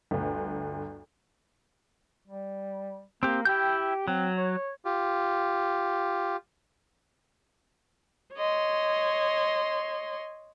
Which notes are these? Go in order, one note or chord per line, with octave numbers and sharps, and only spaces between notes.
G1 D2
G3
A#3 C4 G4
E4 G4 G5 G6
F#3 C4
C#5
F4 G4
C#5 D#5 C6